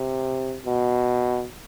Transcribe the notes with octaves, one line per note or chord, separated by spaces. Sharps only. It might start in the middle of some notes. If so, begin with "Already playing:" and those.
Already playing: C3
B2